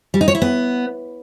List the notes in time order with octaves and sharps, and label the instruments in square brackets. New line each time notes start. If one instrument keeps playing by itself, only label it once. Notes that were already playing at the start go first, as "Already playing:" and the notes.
[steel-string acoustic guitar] G3
D#4
C#5
E4
B3